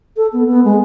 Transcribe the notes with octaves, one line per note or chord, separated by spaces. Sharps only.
A4
B3
B3
G#3